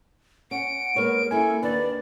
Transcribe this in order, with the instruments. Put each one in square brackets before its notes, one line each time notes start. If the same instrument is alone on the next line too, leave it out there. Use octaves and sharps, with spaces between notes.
[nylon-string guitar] C#4 [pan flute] F#5 [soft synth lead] D7
[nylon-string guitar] G#3 B3 C#5 [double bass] A#3 [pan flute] A#4
[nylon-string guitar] C#4 E4 E5 [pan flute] A4 [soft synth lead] G#5
[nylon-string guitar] D#2 D4 [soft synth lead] B4 [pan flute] D5